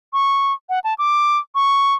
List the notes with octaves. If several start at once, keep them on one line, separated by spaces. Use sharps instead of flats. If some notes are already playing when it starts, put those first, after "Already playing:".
C#6
F#5
A5
D6
C#6